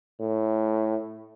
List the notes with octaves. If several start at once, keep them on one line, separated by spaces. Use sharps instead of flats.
A2